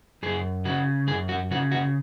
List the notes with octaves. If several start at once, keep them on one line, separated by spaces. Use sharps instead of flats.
F#2 G#4
C#3 F#4
F#2 G#4
F#4
C#3 F#4
F#4